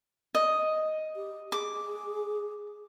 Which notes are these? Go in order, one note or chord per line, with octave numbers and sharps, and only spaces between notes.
D#5
G4
G#4 D6